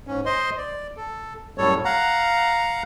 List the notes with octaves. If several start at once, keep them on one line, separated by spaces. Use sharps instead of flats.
G#2 C#4
C5 D#5 C6
D5
A4
F#2 A2 G3 A4 C#5
F5 F#5 A#5